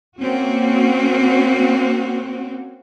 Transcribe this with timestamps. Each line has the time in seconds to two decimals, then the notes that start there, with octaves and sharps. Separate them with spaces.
0.18 A#3 C4 C#4 F#4